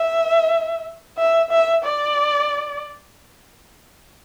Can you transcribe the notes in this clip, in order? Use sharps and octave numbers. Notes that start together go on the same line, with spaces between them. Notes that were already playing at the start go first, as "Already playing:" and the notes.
Already playing: E5
E5
E5
D5